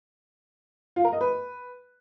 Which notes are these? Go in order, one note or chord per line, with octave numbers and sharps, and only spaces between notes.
F4
A#4
D#5
B4